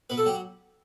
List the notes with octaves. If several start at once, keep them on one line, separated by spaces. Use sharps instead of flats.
B2 B4
A4
F#3 G4